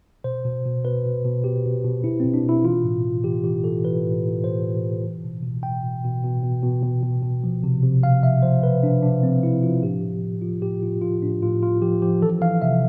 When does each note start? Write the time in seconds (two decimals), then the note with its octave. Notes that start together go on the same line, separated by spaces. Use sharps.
0.24 B2 C5
0.44 B2
0.65 B2
0.85 B2 B4
1.05 B2
1.25 B2
1.44 B2 G4
1.65 B2
1.84 B2
2.04 B2 E4
2.20 C4
2.24 B2
2.34 D4
2.44 B2 E4
2.64 E3 F4
2.84 A2
3.04 A2
3.24 E3 G4
3.44 E3 G4
3.64 E3 A4
3.84 E3 B4
4.05 A2
4.24 A2
4.43 A2 C5
4.64 A2
4.83 E3
5.04 B2
5.24 B2
5.43 B2
5.63 B2 G5
5.83 B2
6.04 B2
6.24 B2
6.43 B2
6.63 B2
6.83 B2
7.03 B2
7.23 B2
7.44 F3
7.64 C3
7.83 C3
8.03 C3 F5
8.22 F3 E5
8.43 F3 C5
8.63 C3 B4
8.83 C3 D4
9.02 F3 D4
9.23 F3 C4
9.42 F3 E4
9.63 F3 F4
9.83 A2 G4
10.02 A2
10.22 A2
10.42 F3 F4
10.62 A2 G4
10.83 A2 F4
11.02 F3 F4
11.22 A2 D4
11.43 A2 F4
11.63 A2 F4
11.82 F3 G4
12.02 F3 G4
12.21 E3 A4
12.41 E3 F5
12.62 C3 E5